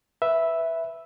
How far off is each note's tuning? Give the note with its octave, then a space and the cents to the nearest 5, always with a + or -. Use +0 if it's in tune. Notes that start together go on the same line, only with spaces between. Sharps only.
B4 +0 E5 +0